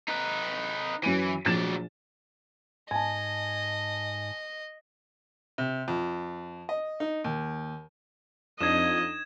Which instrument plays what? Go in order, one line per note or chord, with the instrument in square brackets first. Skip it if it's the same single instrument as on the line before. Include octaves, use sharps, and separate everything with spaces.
[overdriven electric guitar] D#4 B4
[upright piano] F#2 D#7 [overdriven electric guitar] E3
[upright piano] A#1 A6 E7 [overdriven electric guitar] F#3 D5
[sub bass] G#2 [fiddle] D#5 [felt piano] G#5 A5
[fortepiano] C3
F2
D#5
D#4
D#2
[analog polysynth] F2 [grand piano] D4 D#4 [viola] D#5 [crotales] G#6 E7